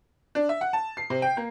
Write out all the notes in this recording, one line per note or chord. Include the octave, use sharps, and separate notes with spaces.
D4
E5
F#5
A5
C7
C3
G5
A#3